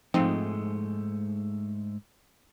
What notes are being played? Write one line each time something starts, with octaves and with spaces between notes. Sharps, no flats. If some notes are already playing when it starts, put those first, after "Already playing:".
G#2 F3 G#3 A3 C4 D#4